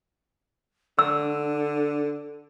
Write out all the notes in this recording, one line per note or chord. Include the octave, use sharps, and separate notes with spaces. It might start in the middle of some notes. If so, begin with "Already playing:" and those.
D3 D4 E6